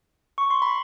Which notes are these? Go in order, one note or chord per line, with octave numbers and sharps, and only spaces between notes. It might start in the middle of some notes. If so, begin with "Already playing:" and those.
C#6
C6
B5